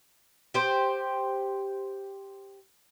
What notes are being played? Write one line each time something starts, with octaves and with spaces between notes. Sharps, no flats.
G4 C5